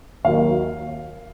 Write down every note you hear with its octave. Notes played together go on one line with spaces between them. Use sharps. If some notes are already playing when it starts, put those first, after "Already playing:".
D#2 D#3 F#3 F5